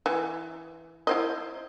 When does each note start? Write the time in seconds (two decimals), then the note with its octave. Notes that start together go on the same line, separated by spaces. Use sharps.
0.06 E3
1.07 E4 C5 D#5